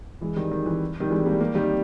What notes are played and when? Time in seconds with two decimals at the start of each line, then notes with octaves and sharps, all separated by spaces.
0.21 E3 G#3
0.36 D#3 G3
0.51 D#3
0.66 E3
1.00 D#3 G3
1.10 E3 G#3
1.26 G3 A#3
1.40 G3 A#3
1.55 D#3 G3